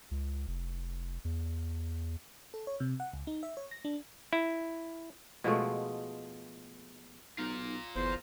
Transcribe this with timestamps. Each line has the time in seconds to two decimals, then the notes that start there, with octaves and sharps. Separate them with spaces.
0.11 C#2
0.48 F1
1.25 E2
2.54 A4
2.67 C#5
2.80 C3
3.00 F#5
3.13 C#2
3.27 D#4
3.43 E5
3.57 C#5
3.71 A#6
3.85 D4
4.33 E4
5.44 B2 F3 G#3 A3
7.38 B1 D#4 F4 A#4
7.96 G1 E2 C5